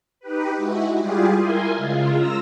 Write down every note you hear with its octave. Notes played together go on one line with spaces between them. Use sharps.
D#4 G4 B4
G#3 E4 F#4
G3 F4 G4 G#4
E4 A#4 G#5 C6
C#3 G#3 F4
A#5 E6 A#6